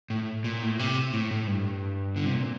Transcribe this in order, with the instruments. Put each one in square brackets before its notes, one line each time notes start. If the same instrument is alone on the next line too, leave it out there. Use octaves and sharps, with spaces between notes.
[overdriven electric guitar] A2
A#2
A2
C3
A2
A2
G2
D3
C3
A#2